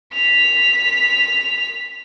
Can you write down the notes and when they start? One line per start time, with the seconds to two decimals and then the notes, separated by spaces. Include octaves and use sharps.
0.13 B6 F7